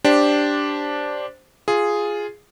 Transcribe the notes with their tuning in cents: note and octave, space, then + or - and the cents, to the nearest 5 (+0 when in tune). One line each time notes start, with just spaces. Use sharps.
D4 -5 G4 +0 C5 +0
F4 +0 G#4 +0